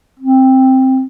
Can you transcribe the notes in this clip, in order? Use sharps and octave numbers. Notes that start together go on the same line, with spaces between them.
C4